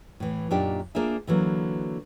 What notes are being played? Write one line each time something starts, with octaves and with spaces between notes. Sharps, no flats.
A2 E3
F#2 A#2 A#3 D4 D#4 G4
A#3 D4 F4 G#4 A#4 E5
D3 E3 F#3 A#3